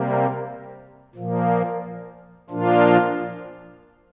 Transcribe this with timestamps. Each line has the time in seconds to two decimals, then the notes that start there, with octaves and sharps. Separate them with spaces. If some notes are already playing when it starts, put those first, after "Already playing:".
Already playing: C3 G3 A#3
1.15 A#2 F3 A#3
2.50 A#2 F3 A#3 D4 F4